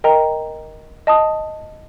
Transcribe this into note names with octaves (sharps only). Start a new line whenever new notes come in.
A#4 D#5 G5 A#5
D#5 A5 D#6